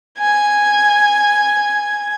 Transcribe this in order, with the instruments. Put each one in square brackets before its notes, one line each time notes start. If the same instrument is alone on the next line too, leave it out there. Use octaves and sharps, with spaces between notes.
[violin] G#5 G#6